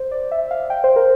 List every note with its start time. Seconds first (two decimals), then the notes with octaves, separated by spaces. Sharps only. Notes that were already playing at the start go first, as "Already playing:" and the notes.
Already playing: C5
0.11 D5
0.32 E5
0.51 F5
0.70 G5
0.84 C5
0.96 A#4